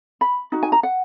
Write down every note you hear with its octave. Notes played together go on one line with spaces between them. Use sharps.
B5
D#4 F#4
G#5
A#5
F#5